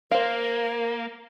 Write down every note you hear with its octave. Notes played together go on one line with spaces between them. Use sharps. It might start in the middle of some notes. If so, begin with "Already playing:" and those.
A#3 A#4 C5 F5